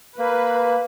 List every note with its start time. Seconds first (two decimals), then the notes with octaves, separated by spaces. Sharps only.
0.18 A#3 B4